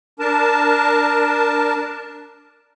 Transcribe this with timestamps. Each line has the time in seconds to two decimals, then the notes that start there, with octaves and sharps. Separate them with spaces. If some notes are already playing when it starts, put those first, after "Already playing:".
0.20 D4 A#4 A5